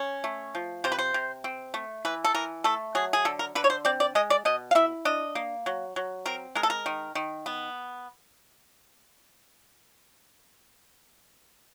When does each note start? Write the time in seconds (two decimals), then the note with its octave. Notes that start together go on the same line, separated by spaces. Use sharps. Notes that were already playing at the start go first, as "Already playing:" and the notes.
Already playing: C#4
0.24 A3
0.55 F3
0.84 C3 C5
0.92 B4
0.99 C5
1.14 C3
1.44 C4
1.74 A3
2.05 E3 B4
2.24 A4
2.35 E3 A#4
2.64 A3 A4
2.95 F#3 G#4
3.13 G#4
3.25 D3 A4
3.39 A#4
3.55 D3 B4
3.64 C#5
3.70 C5
3.85 C4 D5
4.00 D5
4.15 G#3 D#5
4.30 D5
4.45 B2 D#5
4.71 F5
4.75 E4 E5
5.05 D4 D#5
5.35 A#3
5.66 F#3
5.96 F#3
6.26 C4 A#4
6.55 G#3 A#4
6.63 A4
6.70 A#4
6.86 D#3
7.15 D#3
7.46 B3